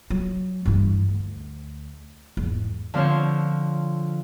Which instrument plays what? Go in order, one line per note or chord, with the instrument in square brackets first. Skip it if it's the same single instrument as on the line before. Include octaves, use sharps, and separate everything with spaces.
[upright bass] F#3
G2 E3
D2
E2 G#2
[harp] D3 F3 C4 F4 C5 C#5